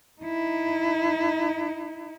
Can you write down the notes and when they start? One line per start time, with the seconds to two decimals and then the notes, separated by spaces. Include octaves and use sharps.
0.21 D#4 E4